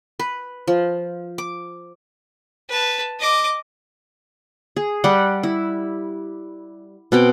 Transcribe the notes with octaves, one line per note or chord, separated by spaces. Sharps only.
B4
F3
D6
B4 A5
D#5 D6
G#4
G3 G4 F#5
E4
B2 C4 G5